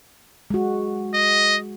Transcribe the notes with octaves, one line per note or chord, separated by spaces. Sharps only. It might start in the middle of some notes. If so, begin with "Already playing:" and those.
G#3 F#4
D#5